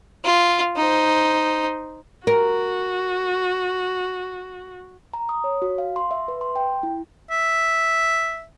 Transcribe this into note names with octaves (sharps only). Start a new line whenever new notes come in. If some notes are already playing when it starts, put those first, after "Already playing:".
F4
D#4 C5
F#4 A#4
A#5
D#6
C#5
F#4
F5
C6
E5
B4
C6
G5
E4
E5